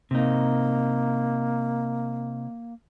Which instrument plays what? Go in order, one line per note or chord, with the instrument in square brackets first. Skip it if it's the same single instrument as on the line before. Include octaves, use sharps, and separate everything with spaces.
[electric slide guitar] C3 D#4 [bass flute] A#3